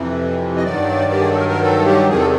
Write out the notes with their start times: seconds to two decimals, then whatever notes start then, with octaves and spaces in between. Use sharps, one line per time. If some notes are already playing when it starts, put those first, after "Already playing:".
Already playing: F2 C3 E3
0.57 D#5
0.64 G2 D#3 F#3 D5
1.12 G4
1.20 G#4
1.29 A4
1.37 A#4
1.49 A#4
1.61 A4
1.86 G4
2.09 E2 C3 D#3 G#4
2.18 A4